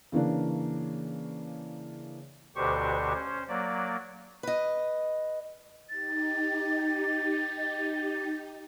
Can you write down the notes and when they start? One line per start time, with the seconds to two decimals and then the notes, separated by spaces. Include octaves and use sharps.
0.12 C#3 E3 A#3 D4
2.56 D2 B2 D3 G4 C5 C#6
3.14 C#4 C5
3.49 F#3 A#3 D5
4.43 B4 D#5
5.89 D#4 G4 A6